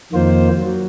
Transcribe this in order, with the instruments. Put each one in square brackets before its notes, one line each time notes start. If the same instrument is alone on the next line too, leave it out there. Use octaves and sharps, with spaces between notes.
[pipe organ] F2 D#3 A#3 F4 C5
F#3